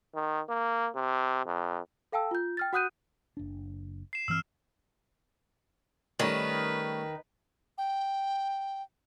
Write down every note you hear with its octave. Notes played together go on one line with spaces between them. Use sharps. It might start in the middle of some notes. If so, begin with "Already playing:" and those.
D#3
A#3
C3
F2
A4 F5 G5 A5 E6
F4 G6
G5 F6 A6
F#4 F#5 D#6 F#6 G6 D#7
F#1 D4
C7 E7
G2 E3 C4 E6 F6
D#3 G3 A3 C#4 B4
G5